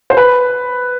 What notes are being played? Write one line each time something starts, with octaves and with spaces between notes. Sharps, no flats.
C5
B4